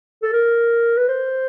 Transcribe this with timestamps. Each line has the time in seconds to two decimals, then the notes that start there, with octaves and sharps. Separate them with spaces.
0.23 A4
0.33 A#4
0.97 B4
1.09 C5